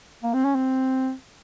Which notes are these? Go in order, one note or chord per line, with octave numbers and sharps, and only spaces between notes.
A#3
C4
C#4
C4